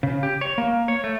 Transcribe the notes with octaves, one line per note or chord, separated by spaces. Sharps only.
C#3
G4
C#5
A#3
C#5
A3